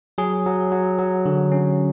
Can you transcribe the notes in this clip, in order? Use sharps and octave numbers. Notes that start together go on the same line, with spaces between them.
F#3 G#4
F#3
F#3
F#3
D3
C#4